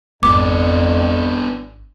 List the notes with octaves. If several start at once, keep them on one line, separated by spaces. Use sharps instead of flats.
G#1 F2 B3 D4 D6